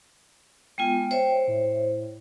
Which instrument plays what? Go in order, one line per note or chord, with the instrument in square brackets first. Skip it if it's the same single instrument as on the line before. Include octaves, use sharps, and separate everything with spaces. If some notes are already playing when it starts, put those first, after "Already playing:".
[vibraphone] G#3 B3 F4 [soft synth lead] G5
[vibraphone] C5 C#5 E5
[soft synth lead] A2